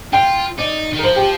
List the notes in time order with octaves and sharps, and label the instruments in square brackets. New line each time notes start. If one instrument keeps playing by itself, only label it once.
[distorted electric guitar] F4 [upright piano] G5
[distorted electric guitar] D#4 [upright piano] D5
[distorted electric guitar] D#3
[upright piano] A#4
[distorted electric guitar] F3 [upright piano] C5
[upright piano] G4